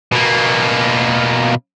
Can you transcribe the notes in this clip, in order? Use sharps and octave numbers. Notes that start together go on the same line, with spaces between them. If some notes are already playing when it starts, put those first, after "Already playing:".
B2 A#3